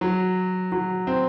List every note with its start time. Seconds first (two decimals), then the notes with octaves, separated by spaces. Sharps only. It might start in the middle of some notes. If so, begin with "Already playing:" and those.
0.01 F#3
0.72 F#3
1.07 C4